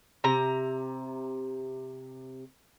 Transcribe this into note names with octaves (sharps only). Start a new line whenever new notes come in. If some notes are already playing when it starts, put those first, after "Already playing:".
C3 A#5